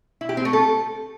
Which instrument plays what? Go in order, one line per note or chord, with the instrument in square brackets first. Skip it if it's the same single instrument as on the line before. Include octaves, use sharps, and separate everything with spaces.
[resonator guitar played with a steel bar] E4
G4
C4
A3
A4